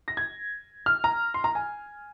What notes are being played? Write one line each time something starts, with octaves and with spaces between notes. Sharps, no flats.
A#6
G#6
F6
A#5
C6
A#5
G#5